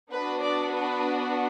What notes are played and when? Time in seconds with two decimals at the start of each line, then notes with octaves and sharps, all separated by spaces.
0.12 B3 D4 F#4 B4
0.42 D5
0.71 B4